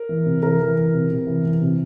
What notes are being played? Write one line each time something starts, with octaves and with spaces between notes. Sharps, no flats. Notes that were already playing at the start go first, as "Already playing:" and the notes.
Already playing: A#4
E3
C3
E3 A#4
E3
E3
C3
C3
E3
E3
C3